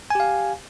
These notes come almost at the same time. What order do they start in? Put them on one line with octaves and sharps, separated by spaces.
G#5 G4 F5